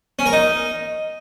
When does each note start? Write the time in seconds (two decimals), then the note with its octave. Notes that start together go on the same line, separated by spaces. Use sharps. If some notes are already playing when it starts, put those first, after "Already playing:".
0.19 C#4
0.26 A#4
0.33 D#4